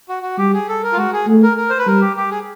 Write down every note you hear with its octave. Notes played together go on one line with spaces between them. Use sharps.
F#4
F#4
G3 G4
G#4
A4
A#4
F4
G#3 F#4
G#4
A3
A#4
A#4
C5
B4
G3 A#4
G4
G4
G#4